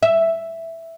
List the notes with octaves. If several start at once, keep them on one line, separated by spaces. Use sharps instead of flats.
E5